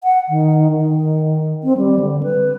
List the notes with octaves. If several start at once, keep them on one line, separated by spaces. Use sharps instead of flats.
F#5
D#3
D#3
C4
G3
D3
B4